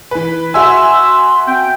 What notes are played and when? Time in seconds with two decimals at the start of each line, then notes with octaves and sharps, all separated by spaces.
0.11 E3 B4
0.54 F#4 E5 G#5 C6 E6
1.47 C4 G5